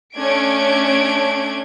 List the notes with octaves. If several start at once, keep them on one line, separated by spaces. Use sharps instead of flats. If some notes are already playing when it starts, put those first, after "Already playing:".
A3 C#4 D4 G#6 D7